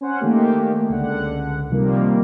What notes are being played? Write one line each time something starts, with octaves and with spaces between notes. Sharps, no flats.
C#4 C5 F#5
D#3 A3 A#3 G4
C#2 D3 F#5
C3 D#3 F3 G3 A#3